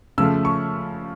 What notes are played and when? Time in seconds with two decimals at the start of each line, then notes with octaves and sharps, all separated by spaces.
0.18 C#3 F3 A3 E6
0.45 C#6